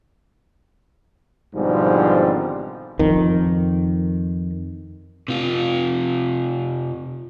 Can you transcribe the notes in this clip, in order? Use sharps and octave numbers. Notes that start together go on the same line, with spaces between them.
G#1 G#2 B2 D3 F3 G3
F2 D#3
C3 F4